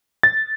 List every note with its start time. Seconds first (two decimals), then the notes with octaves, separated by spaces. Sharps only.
0.23 A6